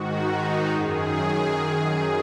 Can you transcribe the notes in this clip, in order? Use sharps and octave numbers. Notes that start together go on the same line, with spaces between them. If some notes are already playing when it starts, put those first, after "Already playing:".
Already playing: G#2 D#3 F#4
D#4
F#2 D#3 G#4